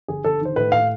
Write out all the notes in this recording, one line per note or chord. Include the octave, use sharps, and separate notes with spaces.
G1 G#4
G1 A4
D#3 C5
A2 B4
A2 F5